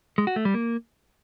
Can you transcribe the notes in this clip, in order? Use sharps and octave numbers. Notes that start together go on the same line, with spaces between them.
G#3
F#4
A3
G3
A#3